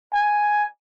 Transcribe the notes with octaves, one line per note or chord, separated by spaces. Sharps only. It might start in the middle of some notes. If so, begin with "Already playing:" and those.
G#5